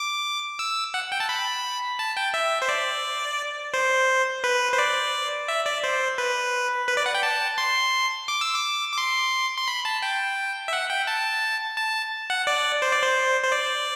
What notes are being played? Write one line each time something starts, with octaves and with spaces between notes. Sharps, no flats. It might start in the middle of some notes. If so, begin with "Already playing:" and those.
Already playing: D6
E6
F#5
G5
A5
B5
A5
G5
E5
C5
D5
C5
B4
C5
D5
E5
D5
C5
B4
B4
D5
F#5
G5
A5
C6
D6
E6
D6
D6
C6
C6
B5
A5
G5
E5
F#5
G5
A5
A5
F#5
D5
C5
D5
C5
C5
D5